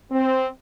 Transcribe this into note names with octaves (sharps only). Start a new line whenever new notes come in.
C4